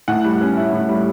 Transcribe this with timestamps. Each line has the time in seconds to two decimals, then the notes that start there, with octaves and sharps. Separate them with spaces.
0.08 A2 F#5
0.24 G3
0.41 C#4
0.57 E4
0.73 A2
0.89 G3